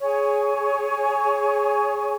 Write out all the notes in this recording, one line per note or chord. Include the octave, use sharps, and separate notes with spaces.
G#4 C#5 G#5 C#6